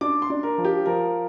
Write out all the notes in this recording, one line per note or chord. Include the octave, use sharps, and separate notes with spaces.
D4 D6
C6
D4
A#4
F3
G4
F3 A#4